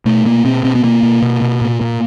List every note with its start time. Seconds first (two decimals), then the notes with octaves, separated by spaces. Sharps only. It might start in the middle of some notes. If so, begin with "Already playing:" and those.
0.05 B2 A3
0.25 B2 A#3
0.45 B2 C4
0.64 B2 C4
0.75 B3
0.84 B2 A#3
1.03 B2
1.22 B2
1.42 B2
1.61 A#2
1.81 A#2